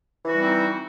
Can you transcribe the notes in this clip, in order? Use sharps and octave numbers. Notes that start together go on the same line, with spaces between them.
E3 G3 C4 D#4 F#4